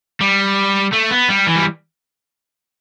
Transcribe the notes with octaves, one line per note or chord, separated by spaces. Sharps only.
G3
A3
B3
G3
E3
G3